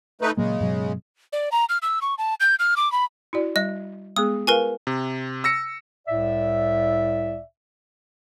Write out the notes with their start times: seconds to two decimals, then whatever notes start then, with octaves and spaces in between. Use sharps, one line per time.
0.21 A3 D#4 B4
0.37 A#2 C#3 F#3 G#3 A#3
0.60 G2 B2 F#3
1.33 D5
1.52 A#5
1.69 F6
1.82 E6
2.02 C#6
2.18 A5
2.40 G6
2.59 F6
2.77 D6
2.92 B5
3.33 E4 F#4 D5
3.56 G3 D#5
4.16 G#3 B3 G#4 D#6
4.47 F4 A#4 B4 F5 G#5
4.87 C3
5.44 E6 A#6 C#7
6.07 C2 A2 D5 E5